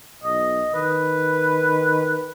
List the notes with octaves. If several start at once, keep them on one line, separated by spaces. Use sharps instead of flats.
B1 D#5
D#3 B4